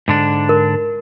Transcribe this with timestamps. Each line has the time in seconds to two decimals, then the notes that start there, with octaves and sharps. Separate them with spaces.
0.08 G#2 D3 D4
0.49 A#4